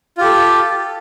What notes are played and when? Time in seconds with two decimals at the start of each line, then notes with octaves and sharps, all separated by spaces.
0.18 F4
0.21 G4
0.24 A4